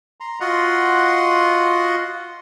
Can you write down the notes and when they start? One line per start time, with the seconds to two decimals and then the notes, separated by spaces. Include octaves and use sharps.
0.20 A#5 C6
0.40 F4 F#4 D#5 F#5 C6